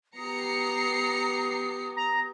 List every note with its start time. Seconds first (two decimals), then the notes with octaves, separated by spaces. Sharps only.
0.17 B3 G4 A#5 D#6 C7 C#7
1.97 A#5